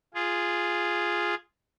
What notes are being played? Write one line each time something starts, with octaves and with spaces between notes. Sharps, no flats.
F4 G#4